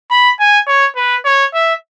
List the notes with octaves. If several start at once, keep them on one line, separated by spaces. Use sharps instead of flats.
B5
G#5
C#5
B4
C#5
E5